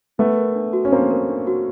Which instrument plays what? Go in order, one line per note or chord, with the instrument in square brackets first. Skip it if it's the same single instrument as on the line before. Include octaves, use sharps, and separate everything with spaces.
[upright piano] A3 B3 [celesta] D4
[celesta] A#4
D4
F#4
[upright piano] C#4
[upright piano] A#3 C4 [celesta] D4
[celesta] A#4
D4
F#4